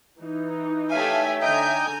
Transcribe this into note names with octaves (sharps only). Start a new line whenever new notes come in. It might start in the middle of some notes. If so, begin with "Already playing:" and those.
E3 D#4
A3 G4 C#5 E5 F5 G#5
D3 D#4 D#5 G5 G#5 A#5 G6